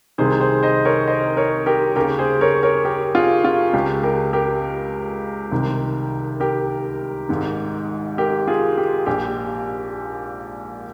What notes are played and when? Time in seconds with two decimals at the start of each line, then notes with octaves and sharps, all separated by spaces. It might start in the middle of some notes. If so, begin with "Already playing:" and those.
0.18 C2 C3 D#3 G#4 C5
0.41 G#4 C5
0.63 C5 D#5
0.85 A#4 C#5
1.07 C5 D#5
1.37 A#4 C#5
1.66 G4 A#4
1.96 D#2 C#3 G4 A#4
2.18 G#4 C5
2.41 A#4 C#5
2.63 A#4 C#5
2.85 G4 A#4
3.14 F4 G#4
3.44 F4
3.73 C#2 C#3 G4
4.03 G4 A#4
4.33 G4 A#4
5.51 C2 C3 D#3
6.40 G4 A#4
7.29 G#1 G#2 D#3
8.18 G4 A#4
8.47 F4 G#4
8.78 G4
9.06 A#1 A#2 G4